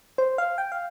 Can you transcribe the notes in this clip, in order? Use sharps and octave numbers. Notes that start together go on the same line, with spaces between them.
C5
F5
G5
F5